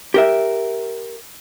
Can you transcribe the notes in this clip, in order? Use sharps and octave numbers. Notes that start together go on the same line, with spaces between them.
G4 A#4 E5